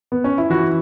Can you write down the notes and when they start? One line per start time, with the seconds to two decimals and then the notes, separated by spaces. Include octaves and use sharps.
0.12 B3
0.24 C#4
0.38 E4
0.50 E3 F#4